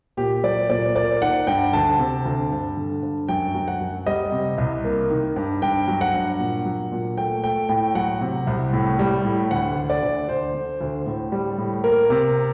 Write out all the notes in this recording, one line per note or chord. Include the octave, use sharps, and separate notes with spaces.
A#2 G4
F#3 D5
A#2 D5
A#3 D5
D#3 F#5
G2 G5
D2 A5
C3
D2
G2
D3
G2
F#2 G5
F#3
F#5
F#2
G3 D#5
C3
C2
A#3
D#3
G2
G2 G5
F#3
F#5
G2
A#2
F#3
A#2
A3 G5
A3 G5
A2 G5
F#3 F#5
C3
C2
A2
G3
A2
D2 F#5
D3
D5
D2
D2 C5
D3
D2
A2
G3
A2
A#3 A#4
C3